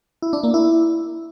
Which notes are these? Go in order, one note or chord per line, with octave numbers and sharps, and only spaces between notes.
E4
D4
A#3
E4